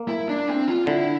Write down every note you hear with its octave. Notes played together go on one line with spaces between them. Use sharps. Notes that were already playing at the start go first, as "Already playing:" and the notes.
Already playing: A#3
E4
D4
C4
F4
D3 E4